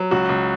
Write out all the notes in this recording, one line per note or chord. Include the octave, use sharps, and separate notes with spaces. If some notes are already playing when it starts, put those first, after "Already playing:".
Already playing: F#3
C#2 F#4
C#2